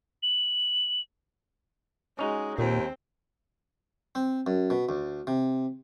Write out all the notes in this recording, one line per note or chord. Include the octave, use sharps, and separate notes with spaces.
F#7
G#3 C#4 D#4 F#4
D#2 A#2 C4
C4
F#2
B2
D2
C3